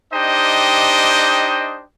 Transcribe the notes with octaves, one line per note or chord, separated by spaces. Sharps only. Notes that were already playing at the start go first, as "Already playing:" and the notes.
D4 D#4 G4 C5 D#5 G5